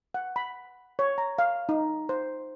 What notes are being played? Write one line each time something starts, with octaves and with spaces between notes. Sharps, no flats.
F#5
B5
C#5
A#5
F5
D#4
C5